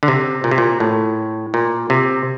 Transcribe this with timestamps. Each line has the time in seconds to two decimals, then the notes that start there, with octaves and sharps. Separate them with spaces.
0.03 D3
0.08 C3
0.44 A#2
0.51 C3
0.58 A#2
0.80 A2
1.54 A#2
1.90 C3